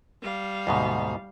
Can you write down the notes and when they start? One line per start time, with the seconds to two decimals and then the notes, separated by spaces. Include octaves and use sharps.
0.22 G3 F5
0.67 D2 G#2 B2